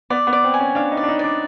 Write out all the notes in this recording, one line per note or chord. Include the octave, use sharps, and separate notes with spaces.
B3 D5
B3
D5
C4
G#5
C#4
D4 F5
D#4
D5
D4
D#4
D4 D5